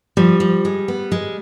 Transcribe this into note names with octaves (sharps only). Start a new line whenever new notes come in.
F3 G3
F3
G#3
B3
G#3